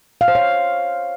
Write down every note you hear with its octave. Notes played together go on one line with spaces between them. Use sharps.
F5
C5
C#5